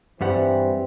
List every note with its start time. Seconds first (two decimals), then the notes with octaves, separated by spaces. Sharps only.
0.21 G2 E3 G3 C4 F#5